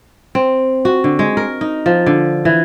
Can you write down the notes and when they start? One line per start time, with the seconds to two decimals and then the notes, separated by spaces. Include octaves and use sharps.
0.35 C4
0.85 F#4
1.04 D3
1.19 G#3
1.37 A#4
1.61 D#4
1.86 F3
2.06 D3
2.45 E3